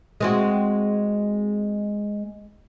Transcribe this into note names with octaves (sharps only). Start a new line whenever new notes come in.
G#3 C4 F#4